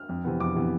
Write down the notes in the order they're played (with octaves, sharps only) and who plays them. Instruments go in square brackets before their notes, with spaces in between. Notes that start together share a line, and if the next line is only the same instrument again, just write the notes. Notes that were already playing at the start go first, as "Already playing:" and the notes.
Already playing: [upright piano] F6
F2
C3 E3 B3
F2 D6
C3 E3 B3